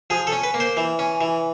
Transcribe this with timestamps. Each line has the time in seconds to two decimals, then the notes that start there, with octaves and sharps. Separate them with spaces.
0.10 F3 G#4
0.27 A4
0.32 C#4
0.43 B4
0.54 A#3
0.60 C5
0.77 E3
0.99 C#4
1.21 E3